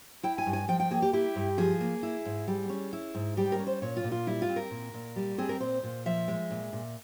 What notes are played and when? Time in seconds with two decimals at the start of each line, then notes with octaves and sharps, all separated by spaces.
0.23 E4 G5
0.38 G#5
0.46 G2
0.53 G#5
0.68 F3 G5
0.80 G5
0.91 A#3 G#4
1.02 G4
1.13 E4 G4
1.36 G2
1.58 F3 G#4
1.81 A#3
2.03 E4
2.25 G#2
2.48 G3
2.69 C#4
2.93 E4
3.15 G#2
3.37 G3 G4
3.52 A#4
3.59 C#4
3.67 C5
3.82 A#2 C#5
3.97 F4
4.04 A#2
4.12 F4
4.27 G3 E4
4.42 F4
4.49 C4
4.56 A#4
4.71 A#2
4.94 A#2
5.16 G3
5.38 C4 G#4
5.49 A#4
5.60 A#2 C5
5.83 A#2
6.06 F3 E5
6.28 G#3
6.50 A#2
6.73 A#2